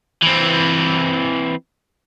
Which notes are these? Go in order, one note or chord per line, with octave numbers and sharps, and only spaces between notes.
E3 C4